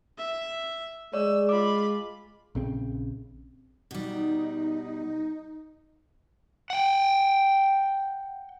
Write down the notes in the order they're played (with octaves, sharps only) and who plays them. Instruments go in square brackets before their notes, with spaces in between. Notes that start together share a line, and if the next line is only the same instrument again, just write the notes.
[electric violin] E5
[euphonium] G#3 [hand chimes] C#5 D5 [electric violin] E6
[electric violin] F4 B5 [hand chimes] D6
[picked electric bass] A#1 C#3 C4
[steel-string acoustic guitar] B2 G3 [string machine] D#4
[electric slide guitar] F#5 G5